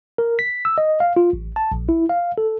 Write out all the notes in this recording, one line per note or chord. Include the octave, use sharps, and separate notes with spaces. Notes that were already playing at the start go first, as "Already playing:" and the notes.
A#4
B6
E6
D#5
F5
F4
A1
A5
A#1
E4
F5
A4